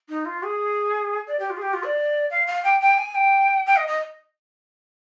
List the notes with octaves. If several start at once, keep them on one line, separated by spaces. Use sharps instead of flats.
D#4
F4
G#4
D5
G4
F4
G#4
G4
F4
D5
F5
F5
G5
G5
G#5
G5
G5
D#5
D#5